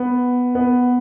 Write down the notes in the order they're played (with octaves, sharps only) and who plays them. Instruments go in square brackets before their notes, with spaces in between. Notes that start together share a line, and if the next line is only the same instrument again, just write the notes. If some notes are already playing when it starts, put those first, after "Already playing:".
Already playing: [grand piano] B3
B3